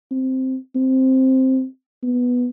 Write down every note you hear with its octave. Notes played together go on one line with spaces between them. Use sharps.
C4
C4
B3